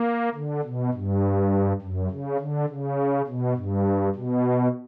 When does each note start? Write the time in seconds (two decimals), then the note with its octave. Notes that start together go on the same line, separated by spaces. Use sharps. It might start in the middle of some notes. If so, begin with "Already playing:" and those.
Already playing: A#3
0.35 D3
0.64 B2
0.93 G2
1.81 F#2
2.11 C#3
2.40 D3
2.69 C#3
3.27 B2
3.56 G2
4.15 B2